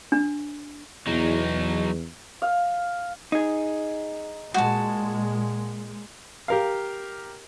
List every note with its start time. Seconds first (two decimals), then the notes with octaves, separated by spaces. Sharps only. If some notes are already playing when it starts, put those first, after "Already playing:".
0.12 D4
1.07 E2 F#3 D#4
2.42 F5
3.32 D#4 G#4
4.54 A#2 G#3 F#4 A5
6.48 G4 A#4 F5